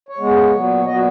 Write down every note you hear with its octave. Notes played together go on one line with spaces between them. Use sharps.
C#5
C#3 G#3 B3
A#2 F#3 B3
C#5
A#2 F#3 B3 D#5
F#4